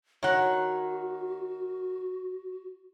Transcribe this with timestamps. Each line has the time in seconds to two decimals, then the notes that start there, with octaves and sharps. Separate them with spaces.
0.23 D#3 F#4 C#5 F#5